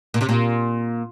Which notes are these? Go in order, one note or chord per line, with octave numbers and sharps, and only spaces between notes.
A#2
C3
A#2